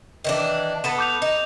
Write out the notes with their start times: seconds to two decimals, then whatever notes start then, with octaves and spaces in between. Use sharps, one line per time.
0.24 D#3 E3 D4
0.84 B3 A4 B4 E7
0.98 D6 G6 F7
1.22 D#4